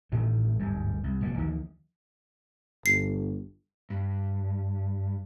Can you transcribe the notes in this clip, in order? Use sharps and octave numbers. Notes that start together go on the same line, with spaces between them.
A1 A2 D#3 A3
D1 G1 G#2 G3
C2
F1 A#2 F#3 A#3
D2 D#3 F3 A#3
G1 C7
G2